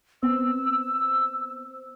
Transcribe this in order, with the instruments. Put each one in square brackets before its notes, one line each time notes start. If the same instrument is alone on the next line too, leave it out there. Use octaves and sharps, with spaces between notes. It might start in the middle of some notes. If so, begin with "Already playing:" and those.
[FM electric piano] B3 C4 C5 [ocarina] E6